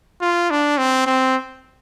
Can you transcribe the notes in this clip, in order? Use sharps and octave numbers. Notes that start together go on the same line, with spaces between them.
F4
D4
C4
C4